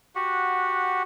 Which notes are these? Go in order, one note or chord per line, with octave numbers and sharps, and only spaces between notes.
F#4 G4 F#5